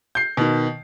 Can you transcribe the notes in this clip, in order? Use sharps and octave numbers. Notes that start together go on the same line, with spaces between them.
G6 C7
B2 D#3